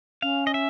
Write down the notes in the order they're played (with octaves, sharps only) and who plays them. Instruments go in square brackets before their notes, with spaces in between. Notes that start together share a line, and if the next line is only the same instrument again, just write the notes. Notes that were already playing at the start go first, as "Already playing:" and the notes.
[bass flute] C#4 [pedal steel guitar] F5
[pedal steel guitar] D#5
E5